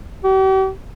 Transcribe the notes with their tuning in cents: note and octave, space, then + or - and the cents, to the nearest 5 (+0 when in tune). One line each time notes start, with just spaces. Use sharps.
G4 -40